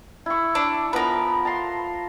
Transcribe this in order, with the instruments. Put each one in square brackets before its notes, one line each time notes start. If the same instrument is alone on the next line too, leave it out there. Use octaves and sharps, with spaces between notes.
[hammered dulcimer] E4 C#6
[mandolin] D4
[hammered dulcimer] F3 B3 [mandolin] A#4 B4
[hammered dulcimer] A5 A#5 C6